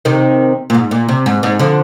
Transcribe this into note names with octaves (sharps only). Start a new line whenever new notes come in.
C3 D#3
A#2
G#2
A#2
C3
G#2
G#2
D3 F3